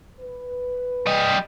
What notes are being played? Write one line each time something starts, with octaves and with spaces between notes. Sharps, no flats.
B4
G3 D#5